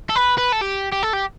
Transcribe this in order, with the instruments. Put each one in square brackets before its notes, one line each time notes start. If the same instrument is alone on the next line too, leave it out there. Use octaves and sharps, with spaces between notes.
[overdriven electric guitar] A4
B4
B4
A4
G4
G4
A4
G4